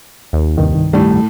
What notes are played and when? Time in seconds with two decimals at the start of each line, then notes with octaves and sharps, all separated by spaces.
0.33 D#2
0.57 C2 G2 D#3
0.93 A2 G3 A3